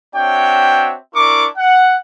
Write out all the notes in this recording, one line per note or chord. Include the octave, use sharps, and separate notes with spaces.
C4 D4 F#4 C#5 E5 G5
D4 E4 A#4 C#6 D6
F#5